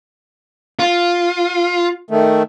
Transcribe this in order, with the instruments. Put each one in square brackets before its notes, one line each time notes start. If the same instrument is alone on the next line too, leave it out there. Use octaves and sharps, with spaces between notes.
[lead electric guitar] F4
[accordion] D#3 A3